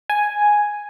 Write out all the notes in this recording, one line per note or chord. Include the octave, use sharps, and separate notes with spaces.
G#5